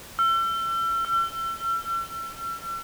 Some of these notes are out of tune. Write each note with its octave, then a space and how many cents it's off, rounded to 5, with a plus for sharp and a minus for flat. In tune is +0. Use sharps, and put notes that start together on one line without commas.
E6 +40
E6 +45